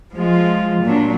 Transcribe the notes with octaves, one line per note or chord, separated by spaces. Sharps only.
F3 G#3 F4
A#2 F#3 D4